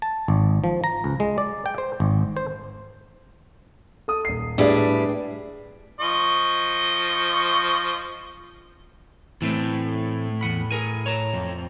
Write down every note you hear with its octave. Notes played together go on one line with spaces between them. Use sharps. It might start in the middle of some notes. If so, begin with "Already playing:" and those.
A5
G#1
F3
A#5
C#2
G#3
D5
G5
C5
G#1
C5
A4 D#6
D#1 C7
A2 G3 D4 G#4 B4 D5
F3 D#5 C#6
A2 E3 A3 C4
E2 F#5 B5
G#4 A#4 G#5
C#5 A5 A#5
F2